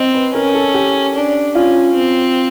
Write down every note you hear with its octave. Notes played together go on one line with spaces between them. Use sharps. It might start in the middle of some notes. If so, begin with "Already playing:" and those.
Already playing: C4 D#5
B4
C#4 A#4
A4
G4
D4
C#4 F4
C4